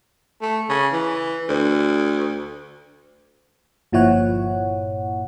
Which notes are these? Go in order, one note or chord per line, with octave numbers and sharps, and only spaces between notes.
A3
C#3
E3
D2
G1 A#2 F3 E4 C#5 F#5